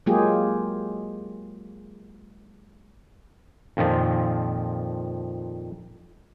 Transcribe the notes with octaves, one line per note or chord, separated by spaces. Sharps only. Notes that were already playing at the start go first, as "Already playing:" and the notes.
F#3 G#3 A#3 F4 G4 G#4
F2 A#2 D#3 F3